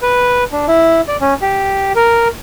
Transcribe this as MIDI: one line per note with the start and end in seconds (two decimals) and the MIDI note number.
0.02 0.44 71
0.52 0.66 62
0.68 1.01 64
1.08 1.16 74
1.21 1.34 61
1.42 1.92 67
1.96 2.28 70